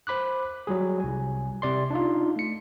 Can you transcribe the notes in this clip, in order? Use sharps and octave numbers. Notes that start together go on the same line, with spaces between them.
C5 B5 D6 F#6
F#3 G3 G#4
C2 G#5
C3 D5 C6
D4 D#4 F4
A3 C#7